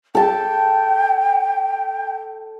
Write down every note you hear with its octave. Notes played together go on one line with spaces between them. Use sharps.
A4 G5 A5